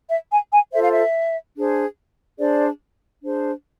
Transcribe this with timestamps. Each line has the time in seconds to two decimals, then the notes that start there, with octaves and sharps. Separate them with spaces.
0.10 E5
0.31 G#5
0.51 G#5
0.72 F4 A4 C5 E5
0.83 F5
0.93 E5
1.56 D4 G#4 C5
2.39 D4 G#4 C5 D5
3.23 D4 G#4 C5